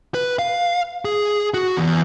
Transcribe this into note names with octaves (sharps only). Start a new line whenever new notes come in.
B4
F5
G#4
F#4
E2